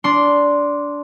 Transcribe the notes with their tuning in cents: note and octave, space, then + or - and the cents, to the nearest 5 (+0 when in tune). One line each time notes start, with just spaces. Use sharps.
D4 -15 C6 +0